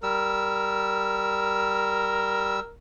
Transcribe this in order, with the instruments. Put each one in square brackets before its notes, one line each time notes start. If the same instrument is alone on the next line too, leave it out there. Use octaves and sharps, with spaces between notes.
[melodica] G3 E6 [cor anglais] A#4